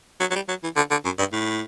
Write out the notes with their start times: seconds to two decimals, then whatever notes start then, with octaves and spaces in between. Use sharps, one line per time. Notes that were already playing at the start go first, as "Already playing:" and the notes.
0.20 F#3
0.31 F#3
0.35 G3
0.48 F#3
0.63 E3
0.76 D3
0.91 D3
1.05 F#2
1.19 G2
1.32 A2